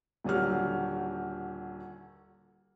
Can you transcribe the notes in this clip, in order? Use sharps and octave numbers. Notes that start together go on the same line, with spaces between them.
D#1 D3 F#3 G4 F6